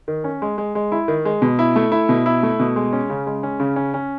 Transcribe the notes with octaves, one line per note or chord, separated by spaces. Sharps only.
D#3
C#4
G#3
G#3
G#3
E4
D#3
G#3
B2
E4
A3
E4
B2
E4
A3
B2
G#3
C#4
C#3
G#3
C#4
C#3
C#4
C#4